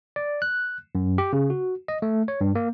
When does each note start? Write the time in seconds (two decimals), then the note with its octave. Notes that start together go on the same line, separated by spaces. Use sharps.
0.16 D5
0.42 F#6
0.95 F#2
1.18 G4
1.33 C#3
1.50 F#4
1.88 D#5
2.02 A3
2.28 C#5
2.41 G2
2.55 A#3